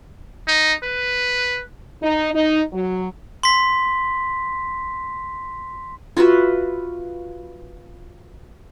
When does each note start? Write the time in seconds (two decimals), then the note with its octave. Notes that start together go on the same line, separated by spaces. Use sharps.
0.47 D#4
0.83 B4
2.02 D#4
2.34 D#4
2.73 F#3
3.43 C6 B6
6.17 F4 F#4 B4 E5